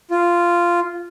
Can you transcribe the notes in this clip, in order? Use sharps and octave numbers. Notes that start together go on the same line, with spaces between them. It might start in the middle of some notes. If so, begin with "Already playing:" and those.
F4